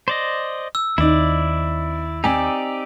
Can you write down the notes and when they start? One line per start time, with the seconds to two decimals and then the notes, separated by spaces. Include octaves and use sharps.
0.08 C5 D5 D#5
0.75 E6
0.98 D#2 C4 D#4 E4 D5
2.24 C4 D#4 G4 D5 G#5